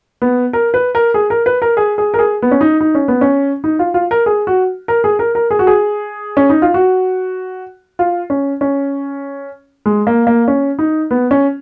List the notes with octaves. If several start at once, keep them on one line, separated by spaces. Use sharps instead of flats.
B3
A#4
B4
A#4
G#4
A#4
B4
A#4
G#4
G#4
A#4
G#4
B3
C#4
D#4
D#4
C#4
B3
C#4
D#4
F4
F4
A#4
G#4
F#4
A#4
G#4
A#4
A#4
G#4
F#4
G#4
C#4
D#4
F4
F#4
F4
C#4
C#4
G#3
A#3
A#3
C#4
D#4
B3
C#4